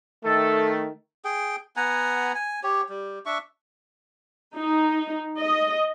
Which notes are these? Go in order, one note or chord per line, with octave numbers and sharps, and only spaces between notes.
D#3 A3 A4
G#4 G5
B3 F#5 G#5 A#5
G#5
G4 C#5
G3
D4 E5 C#6
D#4
D#5